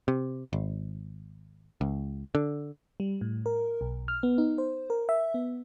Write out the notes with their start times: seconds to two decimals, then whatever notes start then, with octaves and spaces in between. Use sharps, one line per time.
0.08 C3
0.53 G#1
1.81 C#2
2.35 D3
3.00 G3
3.21 A2
3.46 A#4
3.81 B1
4.08 F6
4.23 B3
4.38 D#4
4.58 C5
4.90 A#4
5.09 E5
5.34 B3